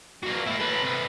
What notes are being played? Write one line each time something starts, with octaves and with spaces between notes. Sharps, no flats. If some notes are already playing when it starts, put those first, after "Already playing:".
A#3 F#4
A#3 E4
A4 B4
C3 B4